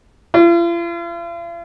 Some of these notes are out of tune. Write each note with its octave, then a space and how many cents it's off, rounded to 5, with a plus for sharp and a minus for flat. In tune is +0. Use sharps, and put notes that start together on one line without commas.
F4 -45